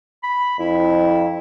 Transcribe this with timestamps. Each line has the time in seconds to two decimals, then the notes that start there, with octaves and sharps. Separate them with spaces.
0.23 B5
0.59 F2 E4